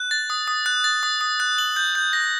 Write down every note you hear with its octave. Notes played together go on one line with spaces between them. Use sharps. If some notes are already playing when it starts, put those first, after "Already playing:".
Already playing: F#6
A6
D#6
D#6
F#6
A6
D#6
D#6
F#6
F#7
G6
G6
A#6